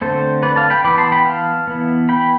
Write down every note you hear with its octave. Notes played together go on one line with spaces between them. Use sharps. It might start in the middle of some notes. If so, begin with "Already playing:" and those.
D3 A3 C4 A4 C5
B4 D5
F5 A5
G5 B5
E3 B3 B5 D6
A5 C6
G5 B5
F5 A5
E3 B3
G5 B5